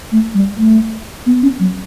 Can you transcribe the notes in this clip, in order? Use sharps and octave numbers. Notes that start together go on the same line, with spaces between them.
A3
G3
A3
B3
C#4
F#3